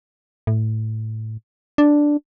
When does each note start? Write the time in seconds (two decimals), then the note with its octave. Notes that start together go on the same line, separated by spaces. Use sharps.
0.47 A2
1.78 D4